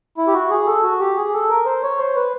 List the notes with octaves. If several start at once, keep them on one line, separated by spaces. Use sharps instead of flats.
E4
G4
F#4
G#4
A4
F#4
G4
G#4
A4
A#4
C5
C#5
C5
B4